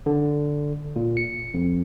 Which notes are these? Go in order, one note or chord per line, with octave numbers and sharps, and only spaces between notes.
D3
A#2
C#7
F2